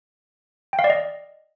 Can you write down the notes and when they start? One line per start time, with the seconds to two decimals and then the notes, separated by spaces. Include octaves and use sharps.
0.73 G5
0.79 F5
0.84 D5
0.90 D#5